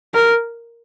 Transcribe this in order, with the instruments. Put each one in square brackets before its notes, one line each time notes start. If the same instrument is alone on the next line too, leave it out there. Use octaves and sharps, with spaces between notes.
[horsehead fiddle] A#4